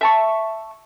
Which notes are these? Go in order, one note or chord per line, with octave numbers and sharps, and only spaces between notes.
E5 A5 C#6